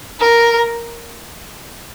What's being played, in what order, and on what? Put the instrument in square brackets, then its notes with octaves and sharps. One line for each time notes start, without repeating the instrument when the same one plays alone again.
[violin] A#4